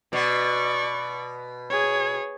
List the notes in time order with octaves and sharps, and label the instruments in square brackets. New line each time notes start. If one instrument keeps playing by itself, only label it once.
[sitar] B2 [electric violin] D5 C#6
[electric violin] G#4 C#5